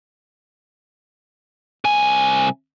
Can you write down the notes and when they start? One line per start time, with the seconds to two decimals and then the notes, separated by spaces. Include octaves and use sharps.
1.85 C2 G#5